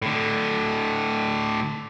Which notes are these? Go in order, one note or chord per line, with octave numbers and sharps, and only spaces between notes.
A2 D3